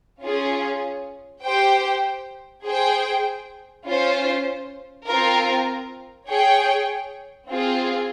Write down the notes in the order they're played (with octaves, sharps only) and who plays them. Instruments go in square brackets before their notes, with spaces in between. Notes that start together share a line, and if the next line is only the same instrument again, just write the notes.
[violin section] C#4 F4 G#4
G4 C5 G5
G#4 C5 G5
C#4 F4 C5
C4 F4 A#4
G#4 C#5 G5
C4 F4 G#4